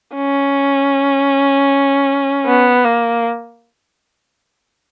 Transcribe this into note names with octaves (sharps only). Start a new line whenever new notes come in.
C#4
B3
A#3